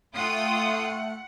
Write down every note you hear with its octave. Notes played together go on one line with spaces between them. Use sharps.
A3 F4 F#5 G5 D#6